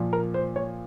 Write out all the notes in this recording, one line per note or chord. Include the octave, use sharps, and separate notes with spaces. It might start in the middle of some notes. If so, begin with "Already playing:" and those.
Already playing: A#2 F3
A#4
C5
C#5